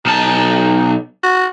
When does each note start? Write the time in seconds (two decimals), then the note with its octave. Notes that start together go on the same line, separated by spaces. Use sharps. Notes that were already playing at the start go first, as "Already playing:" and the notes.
0.06 B1 D#4 A5
1.24 F#4